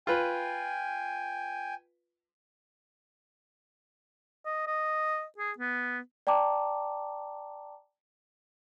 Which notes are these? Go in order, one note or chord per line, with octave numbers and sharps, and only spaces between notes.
F4 B4 G5 G#5
D#5
D#5
G#4
B3
D5 G5 A5 A#5 D6